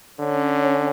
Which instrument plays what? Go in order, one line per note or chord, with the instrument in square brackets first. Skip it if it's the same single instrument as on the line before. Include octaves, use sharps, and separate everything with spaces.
[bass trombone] D3 [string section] C#4